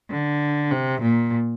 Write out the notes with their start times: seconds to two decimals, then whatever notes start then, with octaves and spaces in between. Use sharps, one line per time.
0.10 D3
0.72 C3
1.02 A#2